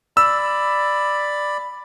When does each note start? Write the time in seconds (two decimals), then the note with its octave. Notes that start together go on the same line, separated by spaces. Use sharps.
0.17 D5 B5 E6